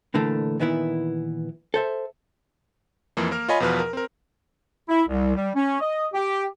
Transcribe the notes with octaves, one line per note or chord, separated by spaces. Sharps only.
A#2 D3 E3 A3 A#3 D4
A#2 D#3 E3 B3 E4
A4 C5 E5
F2 E3 F3 A#3
A#3 A#4 F6
F4 C#5 D#5 G#5 B5
E2 B2 F3 B4 F6
A#4
C4 A#4
E4
C2
G3
C#4
D#5
G4